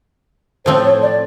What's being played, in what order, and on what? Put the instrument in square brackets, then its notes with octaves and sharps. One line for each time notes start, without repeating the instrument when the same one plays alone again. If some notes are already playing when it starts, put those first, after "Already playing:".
[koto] A2 F3 A3 C4 [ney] C5
[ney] C#5
D5